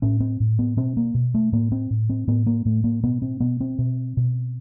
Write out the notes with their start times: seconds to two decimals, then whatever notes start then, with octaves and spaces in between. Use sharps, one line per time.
0.02 A2 C#4
0.20 C4
0.40 A2
0.59 B3
0.77 B2 C4
0.97 A#3
1.14 B2
1.34 A3
1.52 A2 A#3
1.72 C4
1.91 A2
2.10 C4
2.27 A2 B3
2.46 A#3
2.65 A2 A3
2.84 A#3
3.03 B2 B3
3.22 C4
3.40 B2 B3
3.60 C4
3.78 B2
4.17 B2